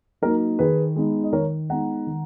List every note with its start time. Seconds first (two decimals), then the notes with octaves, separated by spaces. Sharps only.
0.22 F#3 A#3 D#4 A#4
0.59 D#3 G#4 B4
0.96 G#3 B3 D#4
1.24 D#5
1.33 D#3 A#4 C#5
1.69 G#3 B3 D#4 F#5 A#5
2.07 D#3